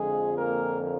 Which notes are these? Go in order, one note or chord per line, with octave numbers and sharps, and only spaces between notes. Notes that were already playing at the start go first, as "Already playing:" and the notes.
Already playing: F2 D3 F3 G#3 G#4
A#3 A#4